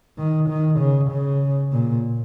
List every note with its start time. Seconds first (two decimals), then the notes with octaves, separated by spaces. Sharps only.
0.18 D#3
0.49 D#3
0.80 C#3
1.11 C#3
1.72 A#2